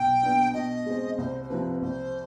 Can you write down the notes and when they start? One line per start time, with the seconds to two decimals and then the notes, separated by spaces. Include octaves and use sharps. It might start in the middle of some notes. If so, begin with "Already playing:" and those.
Already playing: B1 G5
0.22 B2 B3 D4
0.54 B2 D#5
0.86 G#3 C4
1.18 C2 C5
1.42 C5
1.49 C3 F3 C4 B4
1.81 C2 C5